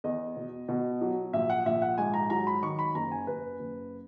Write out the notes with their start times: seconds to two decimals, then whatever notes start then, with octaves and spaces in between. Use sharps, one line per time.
0.04 E2 D#5
0.36 B2
0.68 B2
1.01 F#3
1.33 A#1 E5
1.50 F#5
1.66 A#1 E5
1.82 F#5
1.98 G#2 G#5
2.14 A#5
2.30 F#3 A#5
2.47 B5
2.62 D#3 C#6
2.79 B5
2.95 F#1 A#5
3.11 G#5
3.27 F#1 B4
3.59 F#1